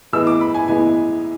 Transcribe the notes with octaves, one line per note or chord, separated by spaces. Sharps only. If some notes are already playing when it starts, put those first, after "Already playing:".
A2 E3 G#3 B3 E6
D6
B5
G#5
A2 E3 G#3 B3 G#5